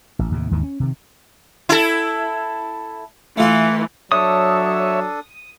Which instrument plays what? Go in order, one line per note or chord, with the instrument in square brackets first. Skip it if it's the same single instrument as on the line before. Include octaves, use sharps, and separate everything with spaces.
[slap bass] A1
D#2 A2 C3
D#2 G#2 D#3 E3
C#4
C3 D#3
[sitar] E4 A4
[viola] E3 [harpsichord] A3 F4 A4
[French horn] F#3 [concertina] D4 A4 [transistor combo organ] C#5 E5 [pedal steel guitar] D#6